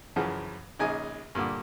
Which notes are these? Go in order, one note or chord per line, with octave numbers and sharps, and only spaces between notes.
F#2 C#3 E3 F3
A#1 C#3 D#4 G#5
G2 A#2 D3